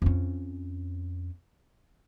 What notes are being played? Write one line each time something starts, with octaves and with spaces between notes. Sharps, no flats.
F2 C#4